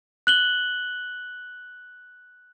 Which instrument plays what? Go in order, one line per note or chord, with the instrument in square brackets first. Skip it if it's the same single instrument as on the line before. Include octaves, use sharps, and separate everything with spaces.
[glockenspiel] F#6 F#7 G7